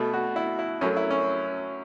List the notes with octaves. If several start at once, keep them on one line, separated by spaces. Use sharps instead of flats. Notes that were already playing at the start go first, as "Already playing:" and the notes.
Already playing: B2 A3
F#4
E4
E4
F#2 F#3 A3 C#4
E4
C#4